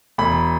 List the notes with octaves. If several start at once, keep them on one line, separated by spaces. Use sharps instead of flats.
E1 B5